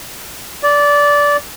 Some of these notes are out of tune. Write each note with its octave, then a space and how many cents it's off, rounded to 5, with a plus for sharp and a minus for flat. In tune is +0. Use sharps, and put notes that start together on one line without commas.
D5 -15